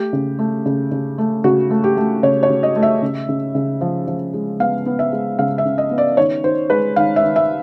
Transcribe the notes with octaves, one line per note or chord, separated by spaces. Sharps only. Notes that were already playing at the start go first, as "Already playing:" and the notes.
Already playing: A3 G4
C#3
A3
C#3
C#3
A3
C#3 F#4
A3
G4
A3
C#3 C#5
C#5
C#3
D#5
A3
E5
C#3
C#3
C#3
F3
F3
G#3
B3 F5
B3
E5
G#3
C#3 F5
E5
C#3
D#5
B3
D5
D#3 C#5
D#3 C5
G#3 B4
D#3 F5
E5
D#3
E5